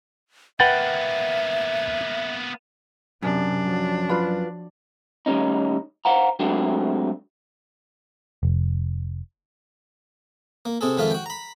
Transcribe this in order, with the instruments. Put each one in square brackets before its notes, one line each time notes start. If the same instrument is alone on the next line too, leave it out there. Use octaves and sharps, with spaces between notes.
[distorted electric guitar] A#3 B3 [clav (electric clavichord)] B4 F#5 G5 [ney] E5 [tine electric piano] A6
[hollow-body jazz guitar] F#2 [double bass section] C3 [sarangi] D4
[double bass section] F3 F#3
[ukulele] F4 B4 B5
[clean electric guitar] A2 D#3 G3 C#4 D#4
C5 F5 F#5 A#5
F#3 G#3 A3 C4 D4 F#4
[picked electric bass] F1
[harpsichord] A#3
C3 C4 G#4 A4
F2 D#3 G#3 F4 A4 E5
F#4 G5
A#5 B5